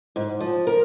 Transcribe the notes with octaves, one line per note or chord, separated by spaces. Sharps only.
G#2
F3
A#4